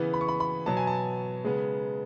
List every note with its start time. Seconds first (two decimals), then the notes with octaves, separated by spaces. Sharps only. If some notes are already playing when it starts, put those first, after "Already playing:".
Already playing: C#3 E3 B3
0.14 B5
0.21 C#6
0.28 B5
0.40 B5
0.66 B2 F#3 B3 A5
0.77 G#5
0.87 A5
1.44 C#3 G#3 B3